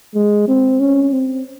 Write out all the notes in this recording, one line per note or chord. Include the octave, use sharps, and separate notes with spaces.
G#3
C4
C#4
C4